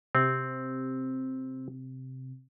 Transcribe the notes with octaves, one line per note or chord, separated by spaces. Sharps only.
C3 C4